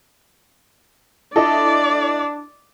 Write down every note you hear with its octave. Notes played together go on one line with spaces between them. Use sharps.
D4 E4 A4 D5 D#5